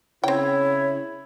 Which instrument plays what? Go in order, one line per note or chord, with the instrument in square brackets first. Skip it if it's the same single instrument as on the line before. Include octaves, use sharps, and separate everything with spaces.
[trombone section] C#3 E4 [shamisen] C4 G5 [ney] C#5